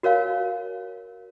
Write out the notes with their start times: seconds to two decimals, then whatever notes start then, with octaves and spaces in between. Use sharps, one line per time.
0.03 F#4 A#4 C#5 F5 G#5